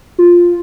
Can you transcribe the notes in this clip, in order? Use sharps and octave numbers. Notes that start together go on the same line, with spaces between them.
F4